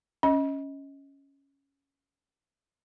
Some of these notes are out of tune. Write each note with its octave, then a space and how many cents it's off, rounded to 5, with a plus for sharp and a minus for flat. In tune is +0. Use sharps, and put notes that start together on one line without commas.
C#4 +0 D#5 +25